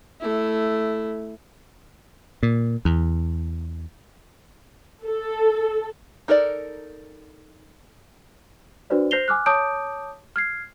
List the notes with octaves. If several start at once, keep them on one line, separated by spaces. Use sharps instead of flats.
A3 E4
A#2
E2
A4
D#4 A4 A#4 C#5 D5
D4 F#4 B4 C5 D5
C5 G6 A#6 C7 F7 G7
G#5 D6 F6 F#6
C#5 A5 D6 D#6 G6 D7
F6 G#6 C7